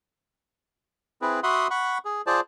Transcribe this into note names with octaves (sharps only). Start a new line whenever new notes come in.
C4 E4 G#4 B4
F#4 E5 F#5 B5 C6 D#6
F#5 B5 C#6
G#4
F4 G#4 C5 D5 A5